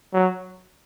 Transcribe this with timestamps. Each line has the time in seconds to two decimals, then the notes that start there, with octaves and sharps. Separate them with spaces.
0.14 F#3